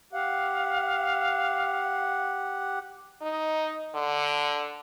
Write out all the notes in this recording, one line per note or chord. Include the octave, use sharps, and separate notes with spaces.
G4 F5 F#5
D#4
D3